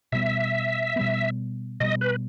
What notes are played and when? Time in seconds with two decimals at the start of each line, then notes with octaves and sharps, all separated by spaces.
0.12 B2 G3 B3 E5
0.96 B2 G3 B3
1.80 B2 G3 B3 D#5
2.01 B4